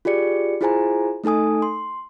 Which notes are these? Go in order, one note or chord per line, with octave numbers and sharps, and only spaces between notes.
F4 G4 G#4 D5 C#7
E4 F4 G#4 C5 G#5 A#5
A3 D#4 A4 G#5 D#6
C6